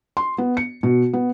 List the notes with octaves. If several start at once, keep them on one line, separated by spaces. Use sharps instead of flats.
C6
B3
C#7
B2
B3